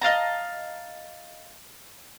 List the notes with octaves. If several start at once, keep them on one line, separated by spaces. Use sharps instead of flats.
D#5 F5 A5 A#5